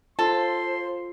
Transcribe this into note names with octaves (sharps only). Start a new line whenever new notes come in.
F4 A4 C5 C6